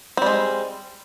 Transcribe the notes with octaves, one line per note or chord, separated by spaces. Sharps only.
G3 G#3 C4